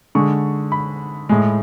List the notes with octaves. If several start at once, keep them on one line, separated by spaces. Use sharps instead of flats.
D3 G#3 C#6
B5
A2 G#3